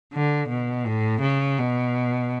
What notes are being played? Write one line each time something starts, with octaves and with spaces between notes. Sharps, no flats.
D3
B2
A2
C#3
B2